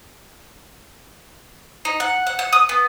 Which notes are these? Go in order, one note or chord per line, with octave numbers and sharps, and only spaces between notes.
D#4
F#5
F#5
F#5
D#6
B3